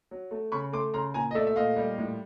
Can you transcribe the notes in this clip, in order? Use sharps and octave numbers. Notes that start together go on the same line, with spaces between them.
F#3
A3
C#3 B5 C#6
A3 C6 D6
C#3 A#5 C6
A#2 G#5 A#5
D#5
A3 D5 E5
E5
A#2 D#5 F5
G3
A2